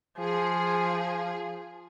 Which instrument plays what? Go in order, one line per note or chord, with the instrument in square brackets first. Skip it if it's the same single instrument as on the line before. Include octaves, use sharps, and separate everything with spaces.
[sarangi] F3 [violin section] G#4